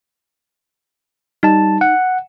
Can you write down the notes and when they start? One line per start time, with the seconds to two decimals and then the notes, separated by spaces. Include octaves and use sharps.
1.43 G3 D#4 A5
1.81 F#5